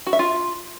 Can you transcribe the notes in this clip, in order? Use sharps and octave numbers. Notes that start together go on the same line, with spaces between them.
F#4
E5
F4